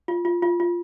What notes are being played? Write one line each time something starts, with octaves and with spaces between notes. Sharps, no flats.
F4
F4
F4
F4